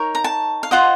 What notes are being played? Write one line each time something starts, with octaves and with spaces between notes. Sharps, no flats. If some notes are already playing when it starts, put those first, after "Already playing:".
Already playing: D#4 A#4 C#5
A#5
A5
F5
F4 C5 D#5 F#5